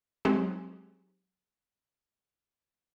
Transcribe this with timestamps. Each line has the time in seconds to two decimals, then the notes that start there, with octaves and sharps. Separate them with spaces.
0.25 F#3 G#3 C4 D#4 G4 G#4